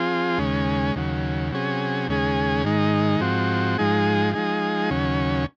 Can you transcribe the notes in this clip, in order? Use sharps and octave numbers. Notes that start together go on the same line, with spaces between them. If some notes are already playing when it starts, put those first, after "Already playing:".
Already playing: F3 C4 F4 G#4
D#2 C#3 G#3 C#4
D#2 C#3 F#3
C3 F#3 C#4 G#4
D#2 C#3 G#3 C#4 G#4
G#2 D#3 G#3 D#4
G#2 F3 C4 F#4
G#2 F3 G#3 D#4 G#4
F3 G#3 D#4 G#4
D#2 C#3 F#3 C#4